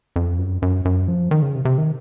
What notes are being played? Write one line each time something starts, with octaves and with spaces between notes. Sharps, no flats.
F2
F#2
F#2
F#2
F3
D#3
C#3
C3
C3
D#3